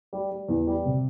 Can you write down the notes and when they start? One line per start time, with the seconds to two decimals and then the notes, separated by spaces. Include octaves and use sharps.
0.13 G3
0.31 G3
0.48 E2
0.67 G3
0.85 C3